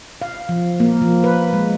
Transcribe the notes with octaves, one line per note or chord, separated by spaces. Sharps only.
F5
F3
A#3
F3
B4
G#3